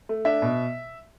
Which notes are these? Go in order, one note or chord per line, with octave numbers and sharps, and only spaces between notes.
A3
D4 E5
B2